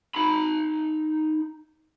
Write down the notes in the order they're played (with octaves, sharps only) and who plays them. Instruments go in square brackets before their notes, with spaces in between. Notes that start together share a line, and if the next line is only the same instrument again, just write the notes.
[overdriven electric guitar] D#4 B5